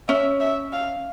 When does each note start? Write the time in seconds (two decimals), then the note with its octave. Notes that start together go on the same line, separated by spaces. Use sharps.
0.08 C#4 E5
0.40 E5
0.73 F5